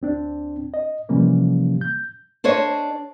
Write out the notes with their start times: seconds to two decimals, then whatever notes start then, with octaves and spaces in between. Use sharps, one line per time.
0.02 D2 C4 D4
0.74 D#5
1.09 C3 E3 F3 G3 A#3 C#4
1.81 G6
2.44 D4 C5 C#5 D#5